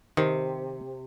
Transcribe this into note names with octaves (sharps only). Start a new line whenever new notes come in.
C3 D#3